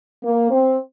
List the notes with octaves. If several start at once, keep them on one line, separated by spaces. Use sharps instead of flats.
A#3
C4